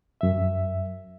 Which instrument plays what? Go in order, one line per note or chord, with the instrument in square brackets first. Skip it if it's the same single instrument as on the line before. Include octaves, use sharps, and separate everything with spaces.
[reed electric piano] F#2 E5